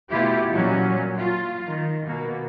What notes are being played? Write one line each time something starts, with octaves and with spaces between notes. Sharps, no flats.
B2 A3 B3 E4 F4 G4
A#2 F#3 G3 C#4
F4
D#3
B2 A#3